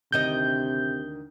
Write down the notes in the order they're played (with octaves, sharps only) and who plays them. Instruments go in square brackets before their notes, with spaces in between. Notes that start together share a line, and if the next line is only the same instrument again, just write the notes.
[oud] D2 D#3 D#5 [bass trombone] C3 [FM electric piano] G6